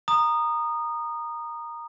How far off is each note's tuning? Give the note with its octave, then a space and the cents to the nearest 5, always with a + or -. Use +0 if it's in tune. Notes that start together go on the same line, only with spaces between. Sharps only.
A#5 +0 D#6 -20